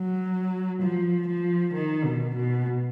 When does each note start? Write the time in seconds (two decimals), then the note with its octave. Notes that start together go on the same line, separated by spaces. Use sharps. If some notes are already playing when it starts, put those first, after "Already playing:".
Already playing: F#3
0.82 F3
1.28 F3
1.74 D#3
2.05 B2
2.36 B2